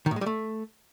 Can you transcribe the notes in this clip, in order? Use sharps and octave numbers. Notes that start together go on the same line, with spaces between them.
D#3
A2
G#3
G3
A3